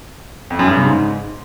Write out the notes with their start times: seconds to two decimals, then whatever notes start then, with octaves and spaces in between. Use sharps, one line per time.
0.50 F2
0.59 F#2
0.68 G2
0.76 C#3
0.85 G#2